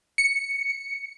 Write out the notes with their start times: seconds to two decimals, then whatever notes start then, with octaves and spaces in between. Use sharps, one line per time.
0.18 C#7